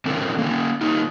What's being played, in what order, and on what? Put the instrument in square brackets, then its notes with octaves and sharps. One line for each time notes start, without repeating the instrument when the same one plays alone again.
[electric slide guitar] D#3 C4 C#4 D#4 A4 A#4
A#3 C#4
A#3 D#4 F4